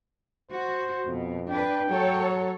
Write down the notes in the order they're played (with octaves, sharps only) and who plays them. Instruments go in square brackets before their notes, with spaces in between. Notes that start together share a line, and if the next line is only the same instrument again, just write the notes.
[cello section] F#4 [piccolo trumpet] C5
[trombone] F2 [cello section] B2
[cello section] D4 B4 [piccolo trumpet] G5
[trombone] F#3 [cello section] A4 C#5